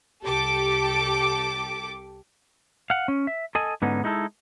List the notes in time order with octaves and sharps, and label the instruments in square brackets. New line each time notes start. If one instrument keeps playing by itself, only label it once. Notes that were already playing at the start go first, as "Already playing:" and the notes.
[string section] C2 G4 A4 D6
[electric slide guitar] F5 F#5
C#4
E5
A4 D#5 G#5
G#2 D3 B3 C#4 D#4
G#3 D#4 E4 A4